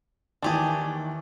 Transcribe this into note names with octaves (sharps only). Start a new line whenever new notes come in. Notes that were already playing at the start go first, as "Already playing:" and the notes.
D#2 E3 D4 G4 G#4